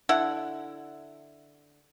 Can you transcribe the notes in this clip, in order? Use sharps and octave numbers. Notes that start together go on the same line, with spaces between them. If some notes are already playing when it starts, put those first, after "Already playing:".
D3 E4 F#5